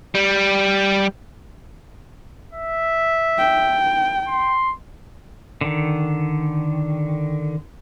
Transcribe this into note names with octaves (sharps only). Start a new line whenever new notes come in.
G3
E5
G5
C6
D3 D#3